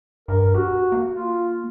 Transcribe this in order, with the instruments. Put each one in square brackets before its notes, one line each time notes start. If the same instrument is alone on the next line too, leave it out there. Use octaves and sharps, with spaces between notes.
[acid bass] G2 [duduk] A#4
[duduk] F#4 [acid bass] G4
[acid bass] A#3
[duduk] F4